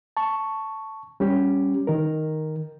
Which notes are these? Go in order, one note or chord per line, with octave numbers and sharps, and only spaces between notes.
A5 C#6
G3 C#4 G4
D#3 A#4